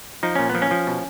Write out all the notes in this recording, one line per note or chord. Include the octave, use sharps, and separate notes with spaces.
F3 D#4
A#2 C#4
B3
F3
C#4
F3
B2